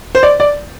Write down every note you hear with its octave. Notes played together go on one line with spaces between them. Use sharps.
C5
D5
D5